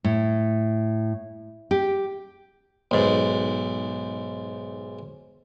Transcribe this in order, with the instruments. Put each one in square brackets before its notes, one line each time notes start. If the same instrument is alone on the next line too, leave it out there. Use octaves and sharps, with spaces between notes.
[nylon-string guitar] A2
G4
[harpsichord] B1 G#2